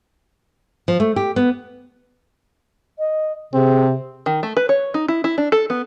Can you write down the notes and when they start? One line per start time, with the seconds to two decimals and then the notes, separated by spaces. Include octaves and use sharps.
0.88 F3
1.00 A3
1.16 G4
1.36 B3
2.99 D#5
3.53 C3 C4 G#4
4.26 D#3
4.43 A3
4.57 B4
4.69 C#5
4.94 D#4
5.08 E4
5.24 E4
5.38 D4
5.52 A4
5.70 B3